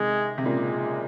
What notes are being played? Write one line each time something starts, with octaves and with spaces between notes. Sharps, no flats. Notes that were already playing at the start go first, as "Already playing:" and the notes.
Already playing: C3 D#3 G#3
C3
A#2 C#3 G#3